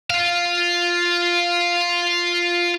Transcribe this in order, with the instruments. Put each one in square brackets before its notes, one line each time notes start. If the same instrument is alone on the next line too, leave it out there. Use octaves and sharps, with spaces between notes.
[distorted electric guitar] F4 F5